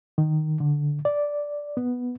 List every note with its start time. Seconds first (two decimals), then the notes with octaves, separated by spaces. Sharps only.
0.18 D#3
0.60 D3
1.05 D5
1.77 B3